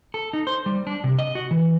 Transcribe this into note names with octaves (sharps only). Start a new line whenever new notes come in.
A4
D#4
C5
G3
D4
C3
D#5
F#4
E3